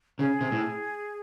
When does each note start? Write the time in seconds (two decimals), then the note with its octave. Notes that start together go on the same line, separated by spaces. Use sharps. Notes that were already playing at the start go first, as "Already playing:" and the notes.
0.19 C#3 G#4
0.41 C3
0.52 A2